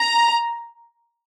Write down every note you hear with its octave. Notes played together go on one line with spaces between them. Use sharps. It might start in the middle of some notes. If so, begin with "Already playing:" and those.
Already playing: A#5